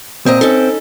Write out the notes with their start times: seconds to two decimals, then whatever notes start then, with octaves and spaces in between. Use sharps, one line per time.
0.26 A#2 C4 D#5 A#5
0.41 C#4 D#4 A4